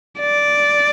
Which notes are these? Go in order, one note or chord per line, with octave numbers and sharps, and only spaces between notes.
D5